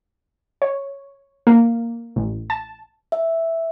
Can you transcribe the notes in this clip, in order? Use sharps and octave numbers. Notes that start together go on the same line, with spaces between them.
C#5
A#3
A1
A5
E5